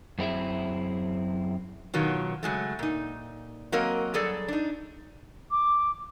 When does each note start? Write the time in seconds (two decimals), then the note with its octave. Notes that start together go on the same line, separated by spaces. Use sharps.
0.18 F#2 C4 E4 G#4 E5
1.94 B2 D#3 F#3 F4
2.43 C#3 F#3 G#3 A3
2.79 A#2 D#4
3.72 F#3 A#3 C4 A#4 D#5
4.14 G2 F#3 G#4 A4 D5
4.48 D4 D#4
5.50 D6